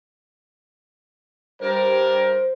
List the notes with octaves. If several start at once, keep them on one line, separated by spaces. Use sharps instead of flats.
G2 G3 A#4 C5